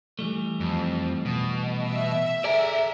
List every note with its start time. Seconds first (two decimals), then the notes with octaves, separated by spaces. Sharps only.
0.19 E3 G3 A3
0.60 F2
1.25 B2
1.87 E5
2.44 G#4 A4 D5 A#5